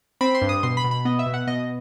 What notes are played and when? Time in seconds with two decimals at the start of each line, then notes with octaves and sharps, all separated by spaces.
0.21 C4 B5
0.35 C6
0.42 G2
0.49 D#6
0.63 B2 C6
0.77 B5
0.84 B2
0.91 B5
1.05 B3 D#5
1.19 E5
1.26 B2
1.34 F#5
1.47 B2 D#5